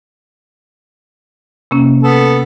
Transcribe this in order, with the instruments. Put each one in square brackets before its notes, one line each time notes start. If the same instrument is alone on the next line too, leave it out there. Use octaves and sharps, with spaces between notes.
[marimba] C3 A#3 C#4
[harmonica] B3 A4